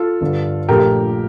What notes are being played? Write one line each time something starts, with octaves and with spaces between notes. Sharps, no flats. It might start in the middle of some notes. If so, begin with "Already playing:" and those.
Already playing: F4 A4
G1 G2 D3
A#1 A#2 F3 A3 G4 A#4